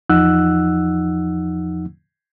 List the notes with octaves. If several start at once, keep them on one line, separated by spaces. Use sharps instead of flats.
E2 F3 D#4 F#5 E6 F#6